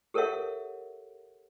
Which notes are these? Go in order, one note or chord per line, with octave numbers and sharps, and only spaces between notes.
G4 A4 A#4 C#5 E5 F#5